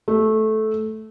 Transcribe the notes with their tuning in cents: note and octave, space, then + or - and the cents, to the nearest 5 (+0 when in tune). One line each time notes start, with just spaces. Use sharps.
A3 -15